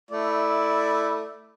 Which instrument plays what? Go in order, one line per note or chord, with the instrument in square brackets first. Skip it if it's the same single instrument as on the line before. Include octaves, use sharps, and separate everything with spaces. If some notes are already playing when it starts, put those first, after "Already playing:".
[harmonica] A3 D5 [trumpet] E4